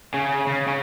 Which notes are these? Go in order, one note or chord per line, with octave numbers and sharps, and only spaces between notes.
C#3
C#3
C#3